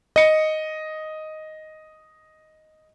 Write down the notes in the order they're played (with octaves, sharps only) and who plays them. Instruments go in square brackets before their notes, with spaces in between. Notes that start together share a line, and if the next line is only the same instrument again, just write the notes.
[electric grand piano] D#5 C#7